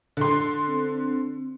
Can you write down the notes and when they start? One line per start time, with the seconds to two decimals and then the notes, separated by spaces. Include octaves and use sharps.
0.17 D3 C6
0.68 C4